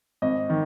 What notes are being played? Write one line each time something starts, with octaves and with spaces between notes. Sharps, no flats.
G#1 D#5
D#3